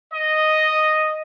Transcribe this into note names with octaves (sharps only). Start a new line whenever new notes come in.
D#5